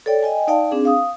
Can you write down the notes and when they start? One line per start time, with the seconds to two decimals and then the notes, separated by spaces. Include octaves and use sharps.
0.06 A4 C#5 D5 G5
0.23 D#5 G5 G#5
0.48 D#4 D5 F5 G5 A5
0.71 C4 D4 G#4
0.85 F5 D#6